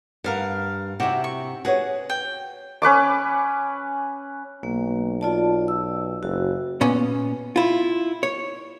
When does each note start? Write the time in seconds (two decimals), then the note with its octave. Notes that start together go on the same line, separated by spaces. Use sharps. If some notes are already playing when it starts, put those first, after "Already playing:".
0.24 G2 A#4 F5 F#5
1.00 C3 E4 F#4 G4
1.24 C#6
1.65 F#4 G#4 B4 C#5 F#5
2.10 G5
2.82 C#4 B4 C#6 D6
4.63 B1 A#3
5.21 F4 D5 A5
5.68 E6
6.23 F#1 F#4
6.81 A#2 B3 C#4
7.56 E4 F4
8.23 C#5